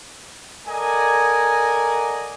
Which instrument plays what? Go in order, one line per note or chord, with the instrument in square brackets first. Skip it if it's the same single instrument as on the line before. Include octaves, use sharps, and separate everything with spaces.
[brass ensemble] A4 A#4 D5 D#5 F#5 G#5